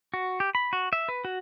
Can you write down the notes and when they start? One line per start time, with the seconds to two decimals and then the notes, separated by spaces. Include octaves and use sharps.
0.14 F#4
0.40 G4
0.55 B5
0.73 F#4
0.93 E5
1.09 B4
1.25 F#4